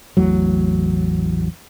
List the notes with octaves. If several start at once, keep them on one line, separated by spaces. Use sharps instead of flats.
A1 E2 A2 F#3